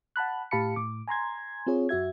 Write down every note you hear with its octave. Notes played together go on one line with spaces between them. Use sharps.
F#5 A5 B5 F#6
A2 G4 F5 A5 B5 C#7
A2 D6
G#5 A#5 C6 G#6
C4 F4 G#4 C#5
F#2 F#4 E5 G#6